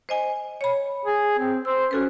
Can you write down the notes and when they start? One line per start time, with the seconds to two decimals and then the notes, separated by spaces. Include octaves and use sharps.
0.09 C5 D#5 G#5
0.61 C#5 B5
1.06 G#4
1.38 C4
1.65 C5 E6
1.91 C#4 F#4 A4 B4